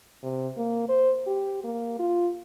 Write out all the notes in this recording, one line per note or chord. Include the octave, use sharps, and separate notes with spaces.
C3
A#3
C5
G4
A#3
F4